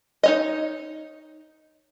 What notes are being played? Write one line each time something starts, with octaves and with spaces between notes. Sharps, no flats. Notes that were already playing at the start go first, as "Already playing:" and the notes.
D#4 C#5 D#5